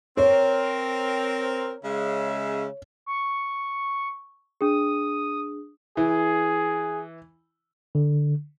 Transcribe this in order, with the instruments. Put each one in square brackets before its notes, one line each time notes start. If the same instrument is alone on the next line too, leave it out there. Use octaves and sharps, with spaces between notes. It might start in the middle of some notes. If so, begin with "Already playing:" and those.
[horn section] C4 A#4 [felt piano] C#5
[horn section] C#3 G#3 E5
[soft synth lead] C#6
[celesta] D4 G#4 [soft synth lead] D#6
[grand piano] E3 [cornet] G#4
[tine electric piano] D3